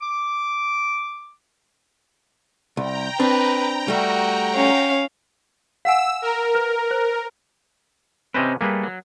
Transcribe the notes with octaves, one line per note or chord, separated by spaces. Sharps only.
D6
C2 G5 A#5
C4 D4 B4
G3 A3 F#4
C#4 F5
F5 F#5 G#5 E6
A#4
B4
C5
C3 C4 C#4 B4 C5 D#5
G3 A3 A#3 G#4 B4
F#3